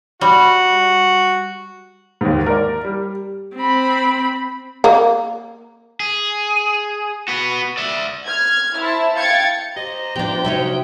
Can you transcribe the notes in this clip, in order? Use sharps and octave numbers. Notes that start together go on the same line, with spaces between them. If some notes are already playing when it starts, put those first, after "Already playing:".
G3 F#4
D#2 G#2
A#4 D5
G3
C4 B5
A#3
G#4
B3 F#4
D5 E5
F6 G#6
E4 C5 A5
F5 G5 G#6 A6 C#7
G4 C5 D#5 A#5
F3 B3 D4 E4 G4 G5
C3 F3 F#3 C#4 D#4 E5